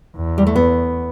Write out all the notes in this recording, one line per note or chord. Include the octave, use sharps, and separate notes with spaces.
E2
G3
A3
B3